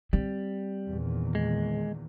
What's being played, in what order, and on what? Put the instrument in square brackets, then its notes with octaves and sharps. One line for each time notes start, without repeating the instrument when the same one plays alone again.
[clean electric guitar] G3 [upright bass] C4
[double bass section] E2 A#2 D#3
[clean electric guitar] G#3